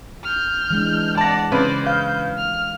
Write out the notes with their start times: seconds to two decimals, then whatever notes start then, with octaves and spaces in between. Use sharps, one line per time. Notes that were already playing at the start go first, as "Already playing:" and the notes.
0.24 F6 G6
0.70 E3 G#3 D4
1.17 D5 F#5 A5 A#6
1.52 C#3 B4 C5 D5
1.87 F5 G6
2.38 F6